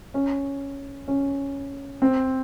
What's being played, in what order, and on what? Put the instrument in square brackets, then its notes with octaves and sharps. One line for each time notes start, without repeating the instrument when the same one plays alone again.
[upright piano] C#4
C#4
C4